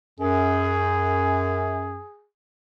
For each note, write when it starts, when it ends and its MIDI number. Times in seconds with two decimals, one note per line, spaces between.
0.20 2.00 42
0.20 2.27 68